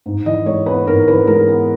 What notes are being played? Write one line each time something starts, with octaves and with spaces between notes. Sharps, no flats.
G#2
E3 D#5
G#3 C#5
B3 B4
G#2 A#4
E3 B4
G#3 A#4
B3